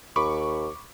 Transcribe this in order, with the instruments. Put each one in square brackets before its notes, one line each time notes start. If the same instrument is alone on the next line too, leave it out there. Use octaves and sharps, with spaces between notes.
[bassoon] D#2 [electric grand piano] B5 C#6 D6